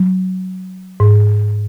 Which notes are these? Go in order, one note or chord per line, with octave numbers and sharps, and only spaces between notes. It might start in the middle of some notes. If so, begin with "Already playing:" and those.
Already playing: F#3
G#2